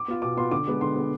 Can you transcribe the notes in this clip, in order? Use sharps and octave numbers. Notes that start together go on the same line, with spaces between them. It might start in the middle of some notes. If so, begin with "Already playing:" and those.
Already playing: D6
B3 F4
B2 D6
B3 F4 C6
D3 D6
G#3 B3
D3 C6
G#3 B3